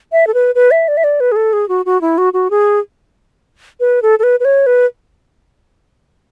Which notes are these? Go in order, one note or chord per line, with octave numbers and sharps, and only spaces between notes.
E5
A4
B4
B4
E5
D5
E5
D5
B4
G#4
A4
G#4
F#4
F#4
E4
F#4
F#4
G#4
B4
A4
A4
B4
B4
C#5
B4